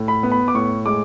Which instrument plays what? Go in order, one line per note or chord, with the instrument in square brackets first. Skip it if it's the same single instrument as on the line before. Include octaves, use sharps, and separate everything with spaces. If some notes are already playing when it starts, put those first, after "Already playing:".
Already playing: [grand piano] A2
B5
B3
B5
D6
A2 C#6
G#3 D6